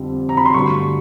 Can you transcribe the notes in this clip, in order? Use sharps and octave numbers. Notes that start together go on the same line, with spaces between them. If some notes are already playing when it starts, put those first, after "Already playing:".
Already playing: F2 D3 G3 C4
A#5
B5
C6
G2 D3 F#3 A3 C#6